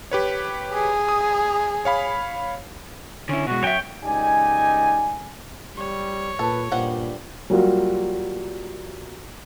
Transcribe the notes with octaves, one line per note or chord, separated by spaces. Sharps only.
G4 B4 C#5
G#4
D#6
C#5 F5 B5
D3 C#4 E4
B2 G#3 F#4
F#2 C#5 E5 G5
C#2 D#4 G4 D5 G#5
G3 C#5
A#2 A4 B4
G2 A#2 F3 G3 F#5
F#3 G3 A#3 F4 F#4